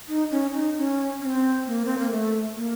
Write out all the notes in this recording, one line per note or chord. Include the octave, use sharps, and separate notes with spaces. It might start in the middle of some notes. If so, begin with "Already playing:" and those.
D#4
C#4
D#4
C#4
C#4
C4
A#3
C4
A#3
A3
A#3